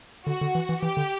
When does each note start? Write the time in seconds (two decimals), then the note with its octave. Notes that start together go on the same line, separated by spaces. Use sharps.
0.27 D3 F#4
0.41 D3
0.55 E3
0.69 E3
0.82 E3 G4
0.97 D3